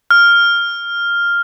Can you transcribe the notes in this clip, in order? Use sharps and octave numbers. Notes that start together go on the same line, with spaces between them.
F6